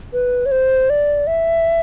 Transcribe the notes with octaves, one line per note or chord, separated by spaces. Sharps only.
B4
C#5
C5
D5
E5